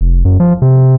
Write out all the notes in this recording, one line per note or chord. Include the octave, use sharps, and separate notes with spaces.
F1
F#2
F3
C3